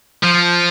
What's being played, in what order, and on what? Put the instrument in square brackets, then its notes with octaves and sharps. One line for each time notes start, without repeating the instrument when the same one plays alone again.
[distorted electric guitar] F3